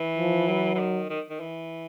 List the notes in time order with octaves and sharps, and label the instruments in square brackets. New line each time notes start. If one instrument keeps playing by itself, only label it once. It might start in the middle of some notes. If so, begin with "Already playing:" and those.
Already playing: [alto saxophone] E3
[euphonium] F3
F#3
[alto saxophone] E3
D#3
D#3
D#3
E3